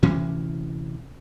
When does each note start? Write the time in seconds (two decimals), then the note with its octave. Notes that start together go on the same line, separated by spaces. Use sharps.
0.03 D2 C3 E3 C#4